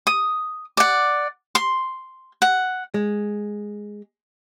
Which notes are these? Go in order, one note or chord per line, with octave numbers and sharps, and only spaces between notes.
D#6
D5 F#5
C6
F#5
G#3